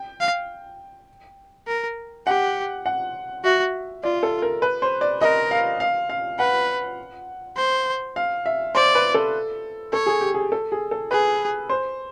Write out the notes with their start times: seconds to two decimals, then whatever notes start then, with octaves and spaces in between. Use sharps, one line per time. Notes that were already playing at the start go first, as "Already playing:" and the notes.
Already playing: G5
0.20 F5
1.67 A#4
2.27 G4 F#5
2.86 F#5
3.44 F#4 E5
4.03 F4 D5
4.23 A4
4.42 A#4
4.62 B4
4.82 C5
5.01 D5
5.21 A#4 D#5
5.51 F5
5.80 F5
6.10 F5
6.39 B4 F#5
7.57 C5
8.16 F5
8.46 E5
8.75 C5 D5
8.95 B4
9.14 A4
9.93 A4 C#5
10.06 G#4
10.21 G4
10.34 G#4
10.52 A4
10.72 G#4
10.91 A4
11.11 G#4 B4
11.69 C5